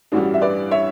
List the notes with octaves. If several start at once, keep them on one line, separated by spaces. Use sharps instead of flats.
A1 G2 E3 G3 D4 F#4
E5
B4 D5
C#5 E5